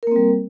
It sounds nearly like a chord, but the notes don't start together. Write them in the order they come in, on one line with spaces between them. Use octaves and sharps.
A#4 A#3 C4 G3